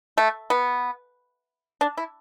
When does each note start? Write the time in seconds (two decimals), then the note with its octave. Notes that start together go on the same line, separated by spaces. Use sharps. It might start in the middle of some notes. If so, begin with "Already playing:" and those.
0.18 A3
0.50 B3
1.81 D4
1.97 E4